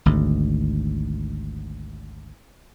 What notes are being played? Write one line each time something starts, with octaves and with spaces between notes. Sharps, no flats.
G#1 D2